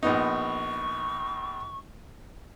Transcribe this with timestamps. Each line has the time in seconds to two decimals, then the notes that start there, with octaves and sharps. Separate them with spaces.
0.03 A#1 B3 D#4 C#6